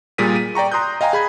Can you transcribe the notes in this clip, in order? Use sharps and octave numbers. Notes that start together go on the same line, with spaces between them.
A#2 G3 G#4 A#4 B6 D#7
D#7
D5 G5 A#5 C#6
A#5 C6 D#6 F#6 G6
D#5 F5 G5 G#5 A#5
G#4 B5 G#6